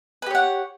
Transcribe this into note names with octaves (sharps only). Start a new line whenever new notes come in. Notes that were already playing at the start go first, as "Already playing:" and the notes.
G4 B4 C#5 F#5